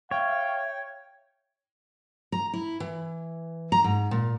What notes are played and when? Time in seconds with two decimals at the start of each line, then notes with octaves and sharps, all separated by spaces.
0.11 C#5 E5 F5 G5
2.32 A#5
2.53 E4
2.80 E3
3.72 A#5
3.84 G#2
4.11 A#2